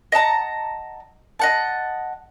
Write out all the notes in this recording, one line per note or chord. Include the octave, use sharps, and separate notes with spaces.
D#5 F#5 A5 A#5
D#5 F#5 A5